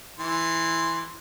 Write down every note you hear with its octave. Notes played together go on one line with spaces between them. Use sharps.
E3 C6